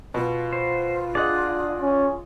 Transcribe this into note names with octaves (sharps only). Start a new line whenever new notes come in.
B2 F4
C5
D4 G#4 D5 D#5 F#5
C#4